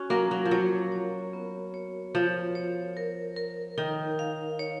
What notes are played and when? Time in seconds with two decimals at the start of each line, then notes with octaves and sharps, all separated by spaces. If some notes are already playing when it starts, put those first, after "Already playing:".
Already playing: C#4 F#4
0.10 F#3 A#3 A#4
0.31 F#3
0.45 F3
0.51 F#3 C#5
0.92 C#5
1.33 B3
1.74 C#5
2.15 F3 C#5
2.55 C#5
2.97 A#4
3.36 A#4
3.78 D#3 D#4
4.19 F5
4.59 C#5